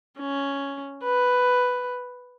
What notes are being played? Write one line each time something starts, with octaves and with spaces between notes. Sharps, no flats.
C#4
B4